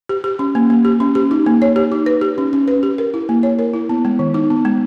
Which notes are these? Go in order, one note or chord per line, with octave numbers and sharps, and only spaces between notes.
G4
G4
C#4
A#3
A#3
G4
C#4
G4
D#4
A#3
C#5
G4
D#4
B4
G4
C#4
C#4
B4
G4
A#4
E4
A#3
C#5
A#4
E4
B3
G#3
D#3
D#4
B3
G#3